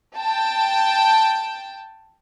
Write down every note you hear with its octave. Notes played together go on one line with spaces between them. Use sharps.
G5 A5